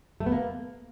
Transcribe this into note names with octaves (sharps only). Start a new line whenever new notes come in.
A3
B3
A#3